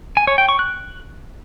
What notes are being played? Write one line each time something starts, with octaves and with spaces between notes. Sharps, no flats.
G#5
C#5
G5
C#6
F#6